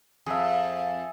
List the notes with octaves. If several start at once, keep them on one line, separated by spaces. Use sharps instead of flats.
F2 G#4 E5